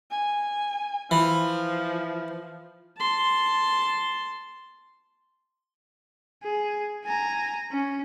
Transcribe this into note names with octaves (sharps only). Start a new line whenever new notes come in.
G#5
E3 F3
A5 C6
G#4
G#5 A#5
C#4